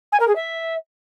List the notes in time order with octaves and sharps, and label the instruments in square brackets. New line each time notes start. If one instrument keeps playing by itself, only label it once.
[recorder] G#5
A#4
G#4
E5